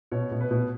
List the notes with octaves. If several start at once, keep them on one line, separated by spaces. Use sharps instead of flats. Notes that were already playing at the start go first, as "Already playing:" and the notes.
B2 C#5
B2
B4
B2